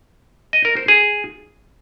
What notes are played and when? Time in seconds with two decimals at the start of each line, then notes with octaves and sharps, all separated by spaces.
0.53 D#5
0.65 A#4
0.77 C5
0.88 G#4